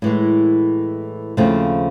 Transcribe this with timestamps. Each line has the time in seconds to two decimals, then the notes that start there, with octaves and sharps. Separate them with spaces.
0.02 A2 E3 G#3
1.37 D#2 C#3 F3 A3 C4